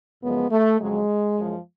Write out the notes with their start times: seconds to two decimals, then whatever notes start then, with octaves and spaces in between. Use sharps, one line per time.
0.23 F#2 C#3 F3 G#3 B3
0.51 A3
0.81 F2 C#3 F#3 G#3
1.37 F#2 F3